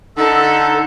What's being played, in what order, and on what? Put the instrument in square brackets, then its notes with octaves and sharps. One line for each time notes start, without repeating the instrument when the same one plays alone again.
[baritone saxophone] D3 [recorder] D#4 [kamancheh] A4 [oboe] E5